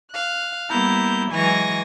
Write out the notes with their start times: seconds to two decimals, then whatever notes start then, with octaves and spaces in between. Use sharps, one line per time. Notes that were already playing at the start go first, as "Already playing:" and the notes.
0.11 F5 F#6
0.70 G3 A#3 B3 E4 A#5 G6
1.31 E3 F#3 G#3 G#5 C#6 A#6